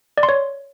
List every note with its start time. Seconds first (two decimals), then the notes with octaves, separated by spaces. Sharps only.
0.18 D5
0.23 C6
0.29 C#5